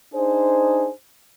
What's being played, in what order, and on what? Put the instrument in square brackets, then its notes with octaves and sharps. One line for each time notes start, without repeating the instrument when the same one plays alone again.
[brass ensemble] D4 D#4 G#4 C5